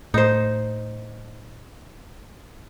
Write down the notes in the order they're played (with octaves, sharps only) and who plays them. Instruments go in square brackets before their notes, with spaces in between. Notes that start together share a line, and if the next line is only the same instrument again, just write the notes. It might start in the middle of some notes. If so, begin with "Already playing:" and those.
[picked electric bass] A2 [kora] D#4 C5